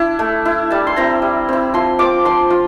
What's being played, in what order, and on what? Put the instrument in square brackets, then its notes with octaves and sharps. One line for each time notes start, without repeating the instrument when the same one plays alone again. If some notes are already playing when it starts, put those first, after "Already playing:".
Already playing: [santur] D4 E4
A3
E4
G3 A5
C6
C4 E4 A#5
G3
C4 E4
F3 C6
C4 F4 D6
F3 C6
F4